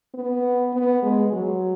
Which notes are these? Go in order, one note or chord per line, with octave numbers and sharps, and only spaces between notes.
B3
B3
G#3
F#3